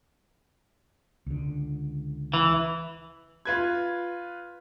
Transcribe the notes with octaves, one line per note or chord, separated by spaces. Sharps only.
C#2 D3
E3
F4 B4 G#6